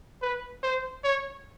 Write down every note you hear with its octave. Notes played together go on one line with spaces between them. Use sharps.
B4
C5
C#5